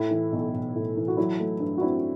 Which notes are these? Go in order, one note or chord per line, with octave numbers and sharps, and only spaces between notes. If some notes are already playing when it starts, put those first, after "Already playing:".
Already playing: A2 E4
E3
B1
B1
A2
E3
F#4
F#3 E4
A3
G2
F#4
C4 E4